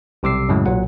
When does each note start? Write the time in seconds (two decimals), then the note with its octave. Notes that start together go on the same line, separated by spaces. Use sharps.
0.23 B1 C3 G3 D6 E6 C7
0.49 F#2 A2 C#3 F#3 G#3
0.66 B1 A#2 F#3 F#5